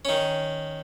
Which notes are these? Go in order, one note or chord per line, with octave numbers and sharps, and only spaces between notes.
D#3 C#4